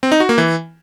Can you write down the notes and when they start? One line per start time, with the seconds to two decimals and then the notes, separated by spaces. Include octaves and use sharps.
0.03 C4
0.12 D#4
0.20 F#4
0.29 A#3
0.38 E3